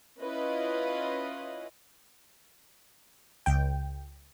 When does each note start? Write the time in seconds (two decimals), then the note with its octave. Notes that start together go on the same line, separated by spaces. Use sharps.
0.21 C#4 E4 F4 B4 D#5
3.46 C#2 G5